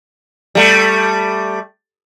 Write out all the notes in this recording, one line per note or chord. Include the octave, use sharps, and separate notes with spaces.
G3 A3